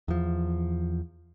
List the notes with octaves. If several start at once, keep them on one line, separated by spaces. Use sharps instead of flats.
E2 F3